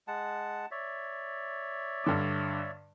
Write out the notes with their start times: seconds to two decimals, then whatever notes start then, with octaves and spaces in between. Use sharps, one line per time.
0.08 G#3 F#5 A5
0.71 C#5 D5 E5
2.04 G2 D3 D6